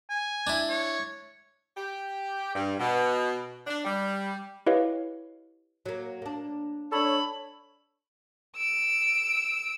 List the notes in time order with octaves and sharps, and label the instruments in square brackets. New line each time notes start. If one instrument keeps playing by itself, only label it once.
[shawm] G#5
[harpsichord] D4 E4
[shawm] C#5
[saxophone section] G4
G2
B2
D4
G3
[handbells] E4 G4 B4 C#5 D#5 F5
[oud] F#3 A#3
A#3 D4
[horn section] D4 A4 C#5 [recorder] B5
[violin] E6 D7